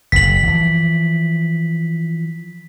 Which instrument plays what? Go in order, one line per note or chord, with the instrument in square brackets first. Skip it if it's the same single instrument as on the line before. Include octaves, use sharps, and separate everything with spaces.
[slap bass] F#1 [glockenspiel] B6 F#7
[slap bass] E3 F3